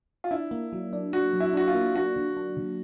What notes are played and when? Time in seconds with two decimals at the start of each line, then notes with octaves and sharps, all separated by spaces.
0.24 F4
0.31 D4 E4
0.51 A#3
0.73 F#3
0.93 D4
1.13 D4 F#4
1.33 F#3
1.40 E4
1.53 D4 F#4
1.68 F4
1.75 A#3
1.95 D4 F#4
2.16 D3
2.37 D4
2.57 D3